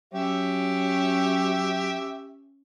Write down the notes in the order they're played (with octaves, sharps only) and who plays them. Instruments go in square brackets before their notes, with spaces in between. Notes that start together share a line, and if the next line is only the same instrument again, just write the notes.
[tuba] F#3 [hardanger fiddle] C#4 [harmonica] G4 E5